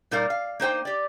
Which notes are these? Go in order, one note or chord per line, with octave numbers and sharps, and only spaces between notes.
A#2 G3 D#4 A#4 D5 F5
F5
A#3 D#4 C5 G5
G4 D5